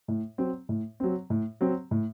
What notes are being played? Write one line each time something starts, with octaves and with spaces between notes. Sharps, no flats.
A2
F#3 C4
A2
F#3 C4
A2
F#3 C4
A2